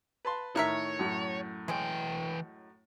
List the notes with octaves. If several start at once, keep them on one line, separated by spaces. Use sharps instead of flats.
B4 A5 C6
A2 D#3 A3 A#4 C#5 E5
F#2 A2
E3 G#3 C#4 G5